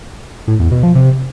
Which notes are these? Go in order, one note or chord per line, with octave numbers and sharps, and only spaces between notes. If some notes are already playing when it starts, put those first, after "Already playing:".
A2
E2
B2
F3
C3